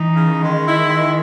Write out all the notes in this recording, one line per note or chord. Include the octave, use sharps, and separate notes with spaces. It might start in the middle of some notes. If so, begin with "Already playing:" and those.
Already playing: E3 D#4
C#3
D#3 G#3
E4
G#3